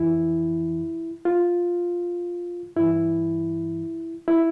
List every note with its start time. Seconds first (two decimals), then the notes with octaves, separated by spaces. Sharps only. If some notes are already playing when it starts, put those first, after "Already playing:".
Already playing: F2 E3 E4
1.25 F4
2.76 G2 E3 E4
4.28 E4